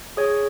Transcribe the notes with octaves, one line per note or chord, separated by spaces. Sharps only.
G#4 C#5